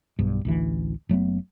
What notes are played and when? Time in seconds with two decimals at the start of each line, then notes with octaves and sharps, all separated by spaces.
0.19 B1 G2
0.45 A1 D2 E3
1.09 F#1 F#3 A3 B3